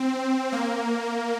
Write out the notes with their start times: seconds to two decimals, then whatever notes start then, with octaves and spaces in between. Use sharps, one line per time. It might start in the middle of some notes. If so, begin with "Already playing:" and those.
Already playing: C4
0.52 A#3